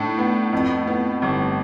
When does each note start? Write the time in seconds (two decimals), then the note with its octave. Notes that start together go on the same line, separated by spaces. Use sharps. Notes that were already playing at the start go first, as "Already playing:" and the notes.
Already playing: A2 D4
0.18 B3
0.53 F2
0.87 B3
1.22 G1